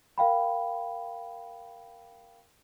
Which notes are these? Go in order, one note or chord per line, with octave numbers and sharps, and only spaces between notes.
A#4 F5 G5 B5